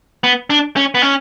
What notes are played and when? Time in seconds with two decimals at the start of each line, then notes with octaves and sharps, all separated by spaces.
0.24 B3
0.50 D4
0.76 C#4
0.95 B3
1.02 C#4